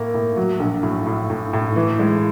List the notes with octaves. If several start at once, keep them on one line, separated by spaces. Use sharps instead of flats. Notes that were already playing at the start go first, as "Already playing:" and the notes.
Already playing: A2 A#3
A2
F#3
A#1
A2
A2
A2
A2
E3
G#3